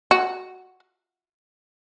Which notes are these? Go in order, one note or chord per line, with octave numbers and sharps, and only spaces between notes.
F#4